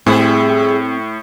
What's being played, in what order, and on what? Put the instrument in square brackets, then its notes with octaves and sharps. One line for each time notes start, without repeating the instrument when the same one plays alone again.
[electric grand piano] A2 [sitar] G3 E4 G#4 [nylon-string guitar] C4